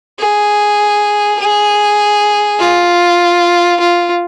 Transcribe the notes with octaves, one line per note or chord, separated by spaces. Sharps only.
G#4
G#4
F4
F4